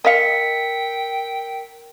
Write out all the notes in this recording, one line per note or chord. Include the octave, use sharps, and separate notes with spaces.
A#4 D#5 F5 G5 B6 C#7